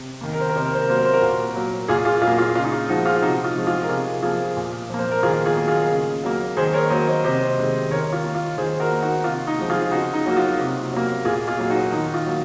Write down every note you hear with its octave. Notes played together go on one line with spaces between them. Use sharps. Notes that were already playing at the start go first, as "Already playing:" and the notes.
Already playing: C3
D#3 A#3
A#4
C5
A#4
C3 C5
A#4
C5
A#4
F#3 A#3 C5
A#4
C5
F#4 A#4
A#2
F#3 A#3
A#2 F4 G#4
F4 G#4
F#3 F4 G#4
A#3
F4
C#3 F4
D#4
F4
F3 G#3 D#4 F#4
F4 G#4
C3 D#4 F#4
F4
F3 G#3
F4 G#4
A#4
C3 F4 G#4
F3 A#3 F4 G#4
A#2
F3 A#3
C5
A#4
D#3 F4 G#4
F4 G#4
F#3 A#3
F4 G#4
C#3
F#3 A#3
D#3 G#4 C5
A#4 C#5
F#3 A#3 C5 D#5
C5 D#5
C3 C5 D#5
D#3 G#3
D#3 A#4 C#5
F4
A#3
F4
D#3 G#4 C5
F#4 A#4
A#3
D#4 F#4
C3 F4
D#4
F3 G#3
F4 G#4
C#3 D#4 F#4
D#4
F#3 A#3 F#4
F4
C3
F#3 A#3
A#2 F4 G#4
F4 G#4
F#3 A#3
D#4 F#4
D#3 D#4
F4
F#3 A#3